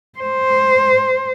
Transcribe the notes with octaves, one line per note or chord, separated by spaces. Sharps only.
C5